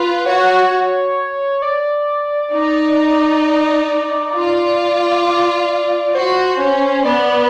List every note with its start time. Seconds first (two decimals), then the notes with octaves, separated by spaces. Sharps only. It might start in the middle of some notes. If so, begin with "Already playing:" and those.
Already playing: F4 B4
0.26 F#4 C#5
1.62 D5
2.53 D#4
4.34 F4
5.25 D5
6.15 F#4 C5
6.60 C#4
7.05 B3 D5